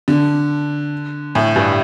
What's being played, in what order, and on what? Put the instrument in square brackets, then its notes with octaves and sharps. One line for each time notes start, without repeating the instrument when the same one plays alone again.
[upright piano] D3
A2
G2